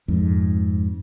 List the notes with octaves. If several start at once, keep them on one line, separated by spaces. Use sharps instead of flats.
F2 G#2